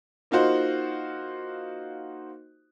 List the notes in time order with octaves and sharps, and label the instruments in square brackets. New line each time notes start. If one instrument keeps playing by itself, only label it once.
[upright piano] A#3 D#4 F4 F#4 C5